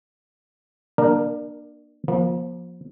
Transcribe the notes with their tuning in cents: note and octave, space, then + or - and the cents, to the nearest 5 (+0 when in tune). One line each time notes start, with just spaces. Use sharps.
A#3 +30 D4 +25 A#4 +0
F3 +15 A#3 +45